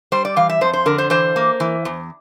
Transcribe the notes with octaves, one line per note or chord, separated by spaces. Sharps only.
G3 C5
D5
E3 F5
E5
F2 C5
C5
D3 A#4
C5
E3 C5
A#3
E3
E2